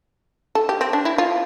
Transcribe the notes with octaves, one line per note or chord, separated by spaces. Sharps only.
A4
G4
C4
D4
E4
F4